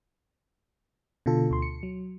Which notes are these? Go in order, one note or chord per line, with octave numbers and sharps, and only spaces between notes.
B2 D3 F4 A4
D2 C6
C#7
F#3